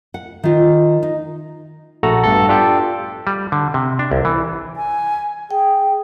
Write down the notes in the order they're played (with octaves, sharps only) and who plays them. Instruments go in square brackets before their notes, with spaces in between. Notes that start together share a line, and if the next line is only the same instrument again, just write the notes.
[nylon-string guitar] F#5
D#3 F4
D#4
[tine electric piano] A#1 A3 F#4 A4 A#5
G2 B3 A4
D4 F4 G4 A4 G5
[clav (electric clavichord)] G3
D3
C3
D4
C2
E3
[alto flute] G#5
[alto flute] G#4 [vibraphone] G5